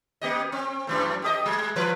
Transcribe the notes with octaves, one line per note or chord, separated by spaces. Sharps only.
A#3 G4 D#5
C4
F#2 E3 A3
G4 A4 D#5
G3
E3 F3 B4